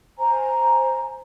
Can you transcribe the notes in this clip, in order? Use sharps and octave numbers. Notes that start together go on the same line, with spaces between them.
C5 G#5 A#5